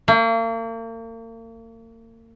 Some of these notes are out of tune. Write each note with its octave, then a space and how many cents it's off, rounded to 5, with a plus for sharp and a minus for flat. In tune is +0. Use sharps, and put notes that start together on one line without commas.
A#3 -40